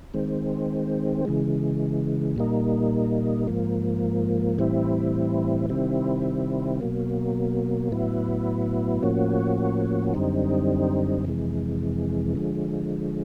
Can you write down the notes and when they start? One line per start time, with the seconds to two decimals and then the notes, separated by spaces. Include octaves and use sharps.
0.14 D#3 G#3 C4
1.25 C#3 E3 G#3
2.36 A#2 G3 A#3 D#4
3.47 G#2 F3 A#3
4.58 A2 E3 G3 C4 E4
5.69 C3 D#3 G3 C4 E4
6.81 B2 F#3 A#3
7.92 A2 F#3 B3 E4
9.02 A2 F3 A#3 C#4 F#4
10.14 F#2 D3 G3 C4 D#4
11.25 F2 C3 E3 G#3
12.35 D3 F3 G#3